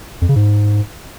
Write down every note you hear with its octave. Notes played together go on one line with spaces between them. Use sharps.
F2
C#3
G#2